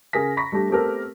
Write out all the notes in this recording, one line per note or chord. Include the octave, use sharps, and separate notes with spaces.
C#3 G#4 A#4 A#6 B6
A#5 B5 C#6 A#6 B6
G3 A3 D4 G4
A3 B3 C4 G4 A4 A#4